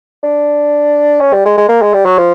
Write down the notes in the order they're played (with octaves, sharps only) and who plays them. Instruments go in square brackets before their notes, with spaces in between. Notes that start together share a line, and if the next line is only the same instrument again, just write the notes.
[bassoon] D4
C#4
G3
G#3
G#3
A#3
G#3
G3
F#3
F3